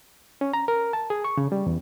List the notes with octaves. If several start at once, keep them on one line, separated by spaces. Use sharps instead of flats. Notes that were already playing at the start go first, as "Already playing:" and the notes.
C#4
A#5
A#4
A5
G#4
C#6
C#3
G3
E2